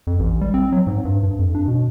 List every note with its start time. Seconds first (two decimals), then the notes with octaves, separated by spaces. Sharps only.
0.07 F2
0.19 A1
0.41 G3
0.54 C4
0.72 F#3
0.87 G#2
1.05 G2
1.23 G2
1.39 F2
1.55 D4
1.68 B2